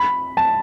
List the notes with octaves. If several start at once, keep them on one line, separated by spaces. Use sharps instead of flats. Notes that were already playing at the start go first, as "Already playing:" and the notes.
Already playing: B5
A5